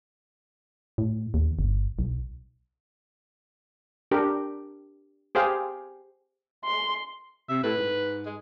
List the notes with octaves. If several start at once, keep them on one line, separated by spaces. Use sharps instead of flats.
A2
D#2
G1
B1
D4 G4 A#4
G4 G#4 C5 F5 G5
C6
C3 E5
A2 B4
G#2
G#3